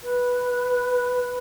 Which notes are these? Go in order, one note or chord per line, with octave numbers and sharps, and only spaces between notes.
B4